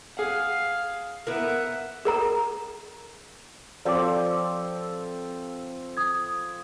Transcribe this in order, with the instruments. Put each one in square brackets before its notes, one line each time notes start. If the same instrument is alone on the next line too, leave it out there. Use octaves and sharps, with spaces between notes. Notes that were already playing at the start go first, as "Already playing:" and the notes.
[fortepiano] G#4 F#5 [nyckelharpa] F5
[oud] B3 E4 A#4 [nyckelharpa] E5 F#5
[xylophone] G#4 A#4 A#5
[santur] F3 C4 A4 [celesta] D5 D6
[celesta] D#6 G#6